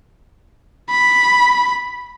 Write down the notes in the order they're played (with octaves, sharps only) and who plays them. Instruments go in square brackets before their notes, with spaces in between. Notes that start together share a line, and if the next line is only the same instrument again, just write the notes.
[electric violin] B5